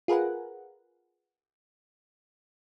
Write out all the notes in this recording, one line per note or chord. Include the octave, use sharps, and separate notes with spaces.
F4 G#4 A#4 B4 F#5